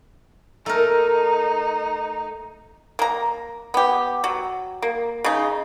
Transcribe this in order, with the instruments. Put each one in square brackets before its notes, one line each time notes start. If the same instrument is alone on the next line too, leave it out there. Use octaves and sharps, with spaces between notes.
[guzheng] A3 A#4 [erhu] D#4
[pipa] A#3 A#5
B3 G4
F#3
A#3
C#3 D#4